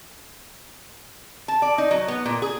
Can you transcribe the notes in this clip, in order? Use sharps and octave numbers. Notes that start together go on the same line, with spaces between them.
A5
D5
D#4
F#3
B3
A#2
G#4